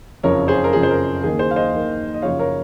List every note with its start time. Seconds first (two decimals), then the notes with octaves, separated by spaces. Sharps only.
0.23 F#1 F2 C#3 F3 A#4 C#5
0.48 G#4 C5
0.64 A#4
0.73 F#1 F2 C#3 F3 G#4
0.83 C5
0.91 A#4
1.23 D#2 D#3 A#3 G#4
1.39 G#4 C5
1.51 F5
1.56 C5 D#5
1.73 D#2 D#3 A#3
2.14 D#5
2.22 F#2 C#3 F3 C#5 F5
2.39 A#4 C#5